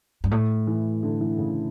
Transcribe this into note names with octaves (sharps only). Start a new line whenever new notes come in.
G2
A2
E3
D3
E3
C#3